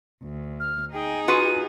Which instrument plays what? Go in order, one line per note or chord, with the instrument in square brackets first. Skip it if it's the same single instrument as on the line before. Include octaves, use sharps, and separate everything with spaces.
[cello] D2
[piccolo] F6
[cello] D#4 G#4 [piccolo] G5
[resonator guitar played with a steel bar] F4 F#4 B4 [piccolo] D#7